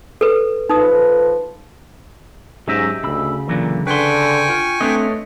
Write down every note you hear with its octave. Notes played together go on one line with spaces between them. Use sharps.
A4 B4
F3 D#4 A4 B4 D#6
G#2 F#3 C#4 G4 D#5 E5 E6
D2 C#3 B5 E6
A#2 D3 E3 F#3
D3 B4 G5 G#5 C6 C#6
F4
A3 C4 D4 B4 C#5 D#5